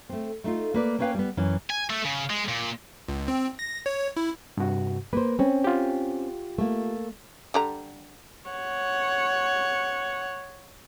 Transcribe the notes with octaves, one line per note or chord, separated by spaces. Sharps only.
A3 C4
A3 D#4 F4
A#3 B4 D5
A#3 B3 C#4 B4 F5 G5
G3 B3
F#2 E3 C#4
G#5
A3
C#3
G#3
A#2
C#2
C4
A#6
C#5
E4
G2 C3 F#4
A#3 B4 C5
C4 C#4
F4 G4
A3 A#3
D3 G3 A#5
C#5 F#5